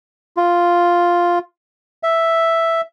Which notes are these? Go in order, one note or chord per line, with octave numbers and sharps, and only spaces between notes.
F4
E5